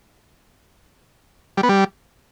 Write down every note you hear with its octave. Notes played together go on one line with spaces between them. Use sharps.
G3
B3
G3